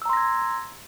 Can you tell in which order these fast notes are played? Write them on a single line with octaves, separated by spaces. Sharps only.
E6 A#5 C6 A#6 G#6